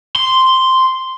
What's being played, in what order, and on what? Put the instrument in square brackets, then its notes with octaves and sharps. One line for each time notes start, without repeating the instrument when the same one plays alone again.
[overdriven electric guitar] C6